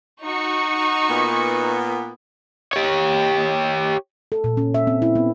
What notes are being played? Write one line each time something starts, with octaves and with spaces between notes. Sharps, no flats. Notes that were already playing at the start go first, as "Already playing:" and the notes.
D#4 F#4 C#6
A#2 B3
G4 C#5
A4
A#2
C#4
E5
C4
E4
B3